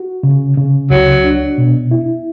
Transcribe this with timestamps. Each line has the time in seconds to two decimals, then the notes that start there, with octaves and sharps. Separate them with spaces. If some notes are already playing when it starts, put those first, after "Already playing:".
Already playing: F#4
0.23 C#3
0.57 C#3
0.90 C#2 F#3
1.24 D4
1.58 B2
1.91 E4